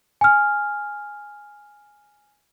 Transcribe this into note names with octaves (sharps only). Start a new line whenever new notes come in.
G#5 F6